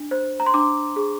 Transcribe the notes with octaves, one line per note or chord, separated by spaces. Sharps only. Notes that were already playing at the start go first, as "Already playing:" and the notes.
Already playing: D4
C5
A#5
C6
D4 D6
G#4